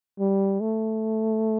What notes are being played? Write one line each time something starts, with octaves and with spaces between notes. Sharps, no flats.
G3
A3